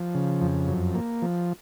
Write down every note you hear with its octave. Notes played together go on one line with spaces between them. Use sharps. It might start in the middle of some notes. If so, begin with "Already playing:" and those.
Already playing: F3
C#3
F2
F#2
A#3
F3